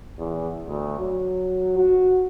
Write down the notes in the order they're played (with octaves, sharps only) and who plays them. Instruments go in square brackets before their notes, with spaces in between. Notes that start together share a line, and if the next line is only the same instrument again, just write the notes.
[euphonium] E2
D2
F#3
F#4